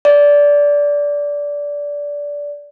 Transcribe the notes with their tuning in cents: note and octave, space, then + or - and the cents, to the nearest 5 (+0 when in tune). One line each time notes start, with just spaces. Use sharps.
D5 -15